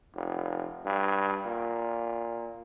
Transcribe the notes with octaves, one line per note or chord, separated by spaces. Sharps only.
F1
G2
A#2